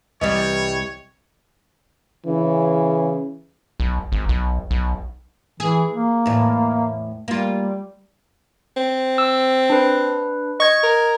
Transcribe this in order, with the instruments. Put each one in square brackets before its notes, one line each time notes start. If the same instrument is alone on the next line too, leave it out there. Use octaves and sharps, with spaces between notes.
[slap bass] C2 [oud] E3 G3 [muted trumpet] C#5 [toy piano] D#5 D#6
[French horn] C#3 [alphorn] E3
[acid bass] B1
G#1
B1
B1
[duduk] E3 [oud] G#4
[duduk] A#3
[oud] E2 A2
[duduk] G3 [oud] A#3 F4
[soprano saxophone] C4
[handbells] E6
D4 B4
[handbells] D#5 G#6 [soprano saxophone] C#6
[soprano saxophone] A#4